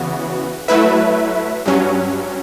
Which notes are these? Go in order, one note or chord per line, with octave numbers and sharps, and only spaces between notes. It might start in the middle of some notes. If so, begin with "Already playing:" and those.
Already playing: E2 C#3 E3 B3 F#4
F#3 A3 E4 B4 E5
G2 F#3 C#4